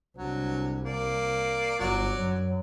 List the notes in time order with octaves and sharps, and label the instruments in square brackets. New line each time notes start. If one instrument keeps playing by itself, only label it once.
[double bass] C2 [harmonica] D3 F#3
[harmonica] A#3 D5
[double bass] G1 [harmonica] F#3 D5
[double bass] F#2